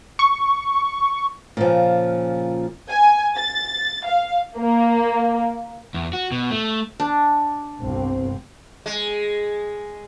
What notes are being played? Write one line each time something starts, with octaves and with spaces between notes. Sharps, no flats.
C#6
A#2 C#3 F3
G#5
A6
F5
A#3
E2
F#4
B2
A3
D4
G1 C2 C4
G#3